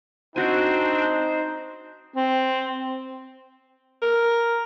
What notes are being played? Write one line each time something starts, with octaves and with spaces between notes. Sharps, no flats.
C4 D4 D#4 F#4 C5 G#5
C4
A#4